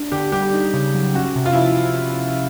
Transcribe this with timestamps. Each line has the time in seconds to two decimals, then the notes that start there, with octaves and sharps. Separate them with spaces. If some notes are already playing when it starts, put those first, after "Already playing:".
Already playing: D4
0.12 D3 G4
0.32 G3 G4
0.54 D#4
0.74 C#3
0.95 F#3
1.14 C#4 F#4
1.36 C3
1.46 F4
1.53 F3 E4